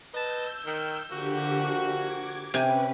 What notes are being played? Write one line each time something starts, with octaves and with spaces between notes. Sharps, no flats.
B4 D#5 A5 E6 G6
D#3
D3 F3 A#3 F#4 G4
D6 G#6
C3 C#4 B4 G#5